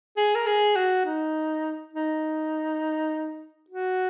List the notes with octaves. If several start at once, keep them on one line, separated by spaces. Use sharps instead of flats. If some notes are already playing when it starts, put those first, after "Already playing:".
G#4
A#4
G#4
F#4
D#4
D#4
F#4